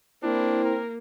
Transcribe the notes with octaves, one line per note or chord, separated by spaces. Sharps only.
A#3 C4 D4 E4
A#4